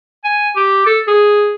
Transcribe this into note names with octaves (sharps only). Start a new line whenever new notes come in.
G#5
G4
A4
G#4